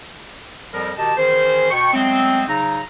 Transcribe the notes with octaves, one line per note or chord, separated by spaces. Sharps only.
F2 F3 G3 A#4
B2 D#3 G4 D#5 A5
D#3 E3 C#4 G#4 C5
B2 G5 C#6
F#3 G#3 A3 B3 C4
C#3 F#3 D#4 A#5